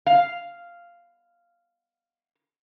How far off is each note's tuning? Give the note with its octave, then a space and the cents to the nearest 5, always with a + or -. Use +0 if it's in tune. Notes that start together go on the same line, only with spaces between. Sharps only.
F5 -5